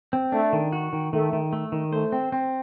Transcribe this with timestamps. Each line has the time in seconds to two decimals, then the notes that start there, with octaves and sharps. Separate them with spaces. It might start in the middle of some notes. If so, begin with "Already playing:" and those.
0.13 C4
0.32 A3 D4
0.53 D#3
0.72 F#4
0.93 D#3
1.13 D#3 A3
1.33 D#3
1.53 A3
1.72 D#3
1.92 A3 C5
2.12 C4
2.32 C4